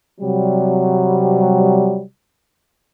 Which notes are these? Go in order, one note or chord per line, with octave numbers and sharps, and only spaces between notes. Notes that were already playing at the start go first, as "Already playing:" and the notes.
C3 F#3 G3